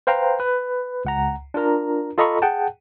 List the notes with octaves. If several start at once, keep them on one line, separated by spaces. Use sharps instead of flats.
B4 C5 F5 G5 A#5
B4
C#2 F#5 A#5
D4 F4 A#4 A#5
F4 A4 D#5 A#5 B5 C#6
G#4 F#5 G5 A5